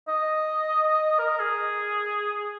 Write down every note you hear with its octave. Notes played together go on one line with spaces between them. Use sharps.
D#5
A#4
G#4